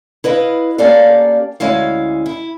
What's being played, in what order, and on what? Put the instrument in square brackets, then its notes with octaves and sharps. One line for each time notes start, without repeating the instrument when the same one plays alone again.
[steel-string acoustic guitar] E4 B4 D#5 F5
A#3 C#4 G4 A4 D5 F5
D2 G#3 C#4 E4 F5
E4